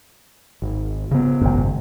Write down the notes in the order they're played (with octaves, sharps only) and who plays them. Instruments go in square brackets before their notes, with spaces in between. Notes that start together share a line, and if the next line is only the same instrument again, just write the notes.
[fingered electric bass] G#1
C#3 B3
[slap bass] G#1 F#2